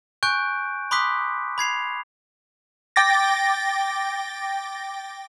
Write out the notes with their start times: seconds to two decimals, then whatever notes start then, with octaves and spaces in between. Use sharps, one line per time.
0.23 G#5 C#6 F#6 G6 D7
0.91 B5 C6 D6 D#6 F#6 B6
1.58 B5 G#6 C7 F7
2.96 G5 D6 A6 A#6